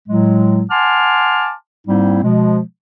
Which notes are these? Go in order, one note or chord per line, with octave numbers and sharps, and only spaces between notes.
A2 F#3 G#3
F#5 G#5 A5 C6 D6 F6
G#2 G3 A#3 C4 D#4 E4
B2 F3 G#3